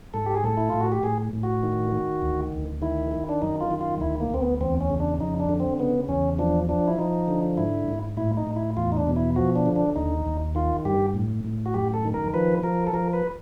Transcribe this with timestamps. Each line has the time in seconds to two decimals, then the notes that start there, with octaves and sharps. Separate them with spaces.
0.14 G#2 A4
0.26 G4
0.35 G#4
0.44 A2 A4
0.57 E4
0.69 A2 F4
0.81 F#4
0.92 G4
1.03 A2 G#4
1.33 A2
1.43 F#4
1.63 D#3
1.92 D#3
2.22 D2
2.52 D2
2.82 D#3 E4
3.11 D#3
3.29 D4
3.42 F#2 D#4
3.61 F4
3.71 D#3
3.81 F4
4.00 D2 E4
4.20 A#3
4.30 D2 C4
4.41 B3
4.61 E2 C4
4.81 C#4
4.90 C#3
5.00 D4
5.20 F2 D#4
5.40 D4
5.49 D3
5.60 C4
5.79 C#3 B3
6.09 E2 C#4
6.39 F3 D4
6.69 F3 D4
6.88 E4
6.99 F3 D#4
7.28 D3
7.57 G#2 E4
7.88 G#2
8.17 A2 E4
8.37 D#4
8.47 A2
8.56 E4
8.77 E2 F4
8.92 D#4
8.97 D4
9.07 B2
9.16 E4
9.36 F3 F#4
9.56 D4
9.66 D3
9.76 D4
9.95 D#2 D#4
10.26 D#2
10.55 D#3 F4
10.85 G2 G4
11.15 A2
11.45 A2
11.66 F#4
11.74 F#2 G4
11.94 A4
12.05 D#3
12.14 A#4
12.34 F3 B4
12.63 F3 A#4
12.87 A4
12.93 F3 A#4
13.13 B4